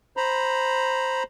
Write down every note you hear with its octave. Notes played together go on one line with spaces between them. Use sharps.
C5 A#5 B5